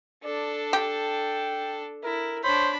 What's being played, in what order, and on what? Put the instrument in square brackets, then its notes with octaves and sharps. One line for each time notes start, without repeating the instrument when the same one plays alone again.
[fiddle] D4 A4 [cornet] D5
[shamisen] G4 [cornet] G5
[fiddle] E4 [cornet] A#4
[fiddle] D4 B5 [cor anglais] C5 [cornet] C#5